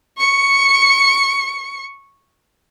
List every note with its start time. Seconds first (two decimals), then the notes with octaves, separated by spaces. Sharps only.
0.18 C#6 C#7